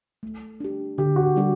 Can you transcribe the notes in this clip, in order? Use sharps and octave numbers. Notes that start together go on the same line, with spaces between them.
A3
D4 G4
D3 G4
F#4
G4
G3 D4 F#4 A4